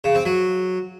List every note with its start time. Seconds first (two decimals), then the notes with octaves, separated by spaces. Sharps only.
0.04 C#3
0.15 C4
0.26 F#3